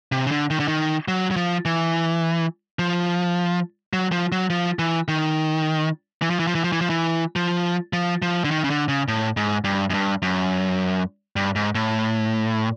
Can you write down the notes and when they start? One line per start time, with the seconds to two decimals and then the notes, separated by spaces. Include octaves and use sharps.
0.12 C3
0.27 C#3
0.31 D3
0.50 D#3
0.60 D3
0.68 D#3
1.08 F#3
1.31 F#3
1.36 F3
1.65 E3
2.79 F3
3.93 F#3
4.12 F3
4.32 F#3
4.50 F3
4.79 E3
5.08 D#3
6.22 E3
6.30 F3
6.39 E3
6.47 F3
6.55 E3
6.64 F3
6.72 E3
6.81 F3
6.90 E3
7.36 F3
7.93 F3
8.22 F3
8.44 D3
8.51 D#3
8.64 C#3
8.70 D3
8.88 C#3
9.08 A2
9.37 G#2
9.64 G2
9.90 F#2
9.94 G2
10.22 F#2
11.36 G2
11.55 G#2
11.75 A2